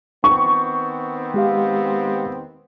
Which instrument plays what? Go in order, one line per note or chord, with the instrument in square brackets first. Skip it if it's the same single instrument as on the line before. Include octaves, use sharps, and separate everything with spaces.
[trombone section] D#3 B3 C4 [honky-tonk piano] C#6
[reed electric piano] G#3 G4 F5